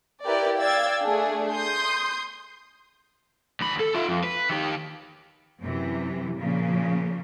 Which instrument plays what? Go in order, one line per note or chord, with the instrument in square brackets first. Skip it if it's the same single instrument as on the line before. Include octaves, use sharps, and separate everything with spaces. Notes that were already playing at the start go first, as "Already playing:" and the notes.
[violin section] E4 G4 A#4 B4 D5
D5 F5 G5 E6 G#6 A6
A3 D4 G#4
C6 D#6 G6
[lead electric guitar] D#2 B5
A4
F4 E5
F2
B4
D#3 G4
[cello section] F#2 C3 E3
A#2 C#3 F3 A#3